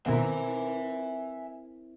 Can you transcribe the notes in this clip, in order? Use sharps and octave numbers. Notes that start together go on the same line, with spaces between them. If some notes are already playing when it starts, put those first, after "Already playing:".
B2 D#3 B3 C4 E4 A#4 E5 G#5